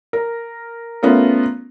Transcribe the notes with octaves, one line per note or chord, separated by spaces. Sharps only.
A#4
A3 B3 C#4 F4 A#4